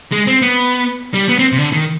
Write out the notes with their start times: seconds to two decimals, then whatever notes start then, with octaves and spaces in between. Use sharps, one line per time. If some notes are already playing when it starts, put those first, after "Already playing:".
0.12 G#3
0.27 C4
0.42 B3
1.14 G3
1.29 B3
1.39 C4
1.52 C3
1.58 D3
1.73 D#3